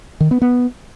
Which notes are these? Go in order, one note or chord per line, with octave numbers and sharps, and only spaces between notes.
D#3
B3
B3